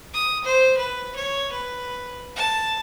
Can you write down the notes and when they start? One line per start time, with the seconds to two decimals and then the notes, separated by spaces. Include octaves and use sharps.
0.14 D#6
0.44 C5
0.77 B4
1.16 C#5
1.52 B4
2.36 A5